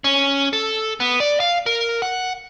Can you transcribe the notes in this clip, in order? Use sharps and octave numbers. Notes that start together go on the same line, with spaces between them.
C#4
A4
B3
D5
F5
A#4
F#5